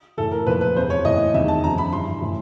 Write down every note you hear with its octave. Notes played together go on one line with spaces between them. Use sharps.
A2 E3 A4
A#4
A#2 F3 B4
B4
E2 C3 E3 C5
C#5
A2 E3 D#5
E2 C3 D#3 E5
A5
F#2 D3 F3 A#5
B5
G2 E3 C6
A2 E3